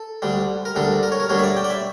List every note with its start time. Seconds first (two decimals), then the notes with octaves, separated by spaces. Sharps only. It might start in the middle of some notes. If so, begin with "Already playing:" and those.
Already playing: A4
0.22 D2 D3 G3
0.65 A#4
0.76 D2 D3 G3 A4
1.03 A#4
1.12 C#5
1.20 A#4
1.29 D2 D3 G3 C#5
1.38 E5
1.44 D5
1.57 G5
1.64 D5
1.70 E5